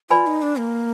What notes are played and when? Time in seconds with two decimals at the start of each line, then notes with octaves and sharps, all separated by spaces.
0.10 F4 B4 D5 G#5 B5
0.27 D#4
0.42 D4
0.58 A#3